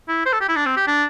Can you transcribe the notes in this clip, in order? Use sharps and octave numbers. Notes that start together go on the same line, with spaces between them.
E4
C5
A4
G4
E4
D4
C4
G4
D4